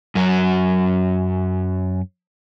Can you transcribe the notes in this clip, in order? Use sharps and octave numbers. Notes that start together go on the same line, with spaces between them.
F#2 F#3